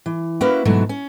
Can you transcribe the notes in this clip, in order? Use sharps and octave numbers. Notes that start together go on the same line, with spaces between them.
E3
A#3 C#4 E4 F#4 B4
G#2 B2 E3 F#3 A3
C#4